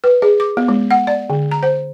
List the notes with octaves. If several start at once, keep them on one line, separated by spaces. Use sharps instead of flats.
B4
G#4
D6
B3
G#3
F#5
D5
D3
A#5
C5